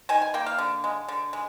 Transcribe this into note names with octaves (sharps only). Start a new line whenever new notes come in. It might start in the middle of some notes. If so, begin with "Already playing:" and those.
D#3 G#5
G#5
A#3 G5
F5
D3
G#3
D3
G#3